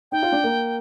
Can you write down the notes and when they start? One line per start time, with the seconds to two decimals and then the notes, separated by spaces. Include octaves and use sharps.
0.12 D#4 G5
0.23 F4
0.32 D4
0.44 A#3